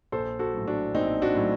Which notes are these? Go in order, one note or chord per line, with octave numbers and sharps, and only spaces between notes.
A#1 A4 C5
F#4 A4
A2 F#3
D4 F#4
A#1 C4 D#4
D4 F#4
A2 F#3